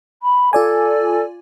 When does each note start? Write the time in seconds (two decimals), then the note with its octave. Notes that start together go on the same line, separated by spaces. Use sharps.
0.22 B5
0.53 F4 A4 D5 G#5